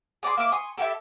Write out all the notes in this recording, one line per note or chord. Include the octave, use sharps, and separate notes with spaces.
G#4 D5 F#5 C6
A#3 E5 D6
G#5 C6 C#6 D#6
E4 F#4 G4 A4